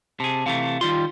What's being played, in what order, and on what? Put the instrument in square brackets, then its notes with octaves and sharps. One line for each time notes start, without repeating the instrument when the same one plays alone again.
[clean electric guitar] C3 G#4 [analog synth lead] A5
[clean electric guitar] C3 E3 A3 [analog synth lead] F5
[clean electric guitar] D#3 G3 C6 [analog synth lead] F4